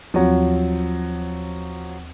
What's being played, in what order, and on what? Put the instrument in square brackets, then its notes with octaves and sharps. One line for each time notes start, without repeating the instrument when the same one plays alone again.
[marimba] D#2 C4 [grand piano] F3 F#3